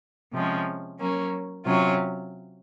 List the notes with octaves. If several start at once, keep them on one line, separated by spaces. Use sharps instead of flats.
C3 F3 G#3 C#4
F#3 A#3 C#4
C3 F#3 C#4 F4